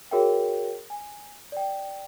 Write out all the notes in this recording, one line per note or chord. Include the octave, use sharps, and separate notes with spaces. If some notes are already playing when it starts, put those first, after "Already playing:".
F#4 G#4 A#4 C#5 E5 G5
G#5
D5 G5